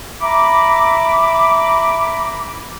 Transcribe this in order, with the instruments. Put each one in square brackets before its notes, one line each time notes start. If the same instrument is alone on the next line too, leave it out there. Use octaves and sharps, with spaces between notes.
[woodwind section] E5 A#5 B5 D6